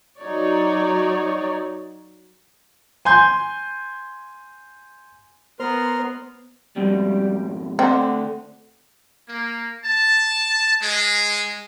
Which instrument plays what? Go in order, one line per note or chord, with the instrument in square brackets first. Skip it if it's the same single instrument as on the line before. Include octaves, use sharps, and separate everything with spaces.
[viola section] F#3 D#4 C#5 D5
[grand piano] G#5 C6 G6
[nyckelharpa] B3 [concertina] A#4 C6 F6 [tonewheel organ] C5
[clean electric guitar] F2 G#2 B2 [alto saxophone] G3
[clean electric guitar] D2 A4 D5 [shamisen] C4 [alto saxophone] F#5
[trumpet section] A#3
A5
G#3